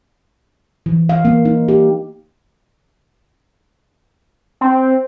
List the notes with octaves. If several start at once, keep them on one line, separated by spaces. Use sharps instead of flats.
E3
F5
A#3
D#4
G4
C4